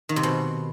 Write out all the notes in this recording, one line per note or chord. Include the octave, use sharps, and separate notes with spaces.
D#3
C3
B2